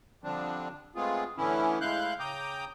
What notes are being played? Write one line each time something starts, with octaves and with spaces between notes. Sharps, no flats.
D3 F3 G3 C4 D4
G#3 A3 B3 C4 F4 G#4
A2 D3 E3 B3 C#4 E4
A2 G#3 E4 F5 F#6 G6
C#3 G5 A#5 D6 D#6 G6